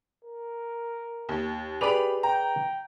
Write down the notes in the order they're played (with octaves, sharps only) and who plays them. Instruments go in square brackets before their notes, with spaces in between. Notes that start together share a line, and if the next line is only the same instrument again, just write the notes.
[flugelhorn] A#4
[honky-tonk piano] D#2
[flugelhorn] G4 [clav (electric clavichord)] G#4 B4 D5 [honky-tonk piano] B5 F7
[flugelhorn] G5 [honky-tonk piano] A#5